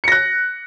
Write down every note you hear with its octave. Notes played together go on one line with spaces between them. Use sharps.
F#6 A#6 C#7